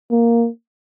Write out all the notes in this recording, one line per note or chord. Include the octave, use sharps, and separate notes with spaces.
A#3